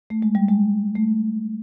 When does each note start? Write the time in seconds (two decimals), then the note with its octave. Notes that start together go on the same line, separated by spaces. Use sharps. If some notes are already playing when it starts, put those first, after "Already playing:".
0.10 A3
0.22 G#3
0.35 G3
0.49 G#3
0.96 A3